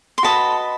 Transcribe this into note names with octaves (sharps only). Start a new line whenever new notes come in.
C6
F#4 B4 D#5 A5 B5